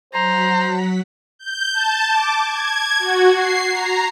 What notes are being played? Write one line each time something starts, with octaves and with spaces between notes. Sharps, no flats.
F#3 C5 F#5 A#5 B6
G6
A5
D6
G#6
F#4
C7
A#5